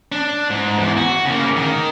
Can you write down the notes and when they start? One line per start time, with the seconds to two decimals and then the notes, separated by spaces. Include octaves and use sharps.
0.12 D4
0.50 G#2
0.79 E2
0.97 F#4
1.25 C#3 A#3
1.56 D#3